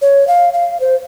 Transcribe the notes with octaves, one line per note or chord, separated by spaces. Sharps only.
C#5
F5
F5
C5